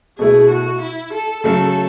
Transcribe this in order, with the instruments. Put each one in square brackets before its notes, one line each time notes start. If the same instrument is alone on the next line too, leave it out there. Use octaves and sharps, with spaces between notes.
[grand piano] B2 A3 E4 [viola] G#4
[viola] F#4
E4
A4
[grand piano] C#3 F#3 A3 [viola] A4